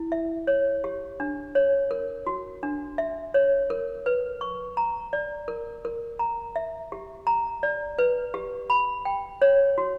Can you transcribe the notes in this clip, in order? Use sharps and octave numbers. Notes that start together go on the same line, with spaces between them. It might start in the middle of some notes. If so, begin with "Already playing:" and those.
Already playing: E4
E5
C#5
G4
D4
C#5
A#4
F#4
D4
E5
C#5
A#4
B4
C#6
A#5
D5
A#4
A#4
A#5
E5
G4
A#5
D5
B4
G4
B5
G5
C#5
F#4